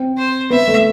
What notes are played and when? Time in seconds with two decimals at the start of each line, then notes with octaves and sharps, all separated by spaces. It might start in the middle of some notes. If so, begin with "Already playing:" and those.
Already playing: C4
0.18 C5
0.50 B3 E5
0.68 A3